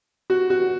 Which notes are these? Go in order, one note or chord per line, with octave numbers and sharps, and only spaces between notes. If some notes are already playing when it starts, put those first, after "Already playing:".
F#4
F#4